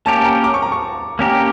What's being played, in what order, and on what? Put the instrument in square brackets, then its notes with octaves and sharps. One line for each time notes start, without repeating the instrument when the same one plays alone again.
[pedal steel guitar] A#3 C#4 G4 A#4 [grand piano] A5
[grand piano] A5
A#5
D6
C#6
A#5
C#6
[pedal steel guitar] A#3 C#4 G4 A#4